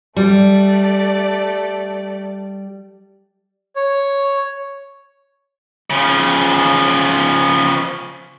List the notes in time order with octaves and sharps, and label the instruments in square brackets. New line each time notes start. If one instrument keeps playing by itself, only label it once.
[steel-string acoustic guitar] G3 [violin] A3 D5
[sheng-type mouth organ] C#5
[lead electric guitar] C#3 F3